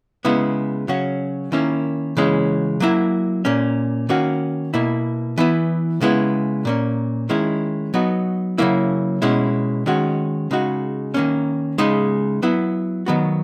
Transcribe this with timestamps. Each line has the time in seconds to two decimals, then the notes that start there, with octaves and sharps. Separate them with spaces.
0.25 C#3 G#3 B3 E4
0.88 C#3 F#3 C#4 F#4
1.52 D#3 A#3 C#4 E4
2.17 C#3 E3 G#3 C#4
2.80 F#3 A#3 E4
3.45 A#2 A#3 C#4
4.09 D#3 A#3 C#4 F#4
4.74 B2 A#3 E4
5.38 E3 B3 E4
6.01 C#3 G#3 B3 E4
6.65 A#2 A#3 C#4
7.29 D#3 G#3 C#4 E4
7.94 F#3 B3 D#4 F#4
8.58 C#3 F#3 A#3 E4
9.22 B2 G#3 C#4 E4
9.86 D#3 G#3 C#4 F#4
10.51 C#3 G#3 D#4 F#4
11.14 D#3 A#3 C#4
11.78 C#3 G#3 D#4
12.42 F#3 B3 E4
13.06 D#3 F#3 B3 F#4